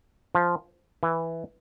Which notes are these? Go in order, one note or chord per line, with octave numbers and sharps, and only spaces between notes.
F3
E3